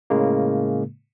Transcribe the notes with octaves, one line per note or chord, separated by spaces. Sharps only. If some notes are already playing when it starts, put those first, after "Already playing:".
A2 C#3 G#3 A#3